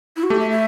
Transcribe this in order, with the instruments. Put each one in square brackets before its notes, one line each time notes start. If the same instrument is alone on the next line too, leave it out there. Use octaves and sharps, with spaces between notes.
[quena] E4
F#4
[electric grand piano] A3 [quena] G4
[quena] E5
E5